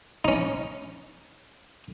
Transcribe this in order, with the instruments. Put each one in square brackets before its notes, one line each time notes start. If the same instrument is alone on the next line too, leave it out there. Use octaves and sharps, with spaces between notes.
[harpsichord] C#4 D#4